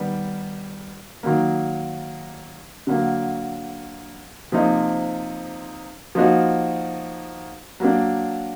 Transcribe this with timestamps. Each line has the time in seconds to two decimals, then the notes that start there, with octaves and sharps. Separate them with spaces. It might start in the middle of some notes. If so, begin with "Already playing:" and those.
Already playing: D#3 G3 B3
1.23 D#3 F#3 A#3
2.87 D3 F#3 A#3
4.52 C3 F3 A#3 D#4
6.15 F3 A#3 D#4 F#4
7.80 F#3 A#3 D4